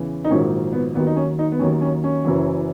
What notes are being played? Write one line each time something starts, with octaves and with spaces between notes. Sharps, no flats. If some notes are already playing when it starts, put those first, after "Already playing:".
Already playing: E2 C#3 E3
D#4
A#1 G#2 D#3 F#3 C#4
B3
D#2 D#3 F#3 B3
D#4
C#4
D#4
B3
D#2 D#3 F#3 C#4
C#4
C#4
F#1 F#2 E3